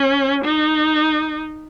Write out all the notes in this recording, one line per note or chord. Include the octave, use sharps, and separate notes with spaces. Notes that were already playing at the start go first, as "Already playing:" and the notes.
Already playing: C#4
D#4